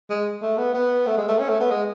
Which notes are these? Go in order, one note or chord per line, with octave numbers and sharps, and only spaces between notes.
G#3
A3
B3
B3
A3
G#3
A3
C#4
A3
B3
G#3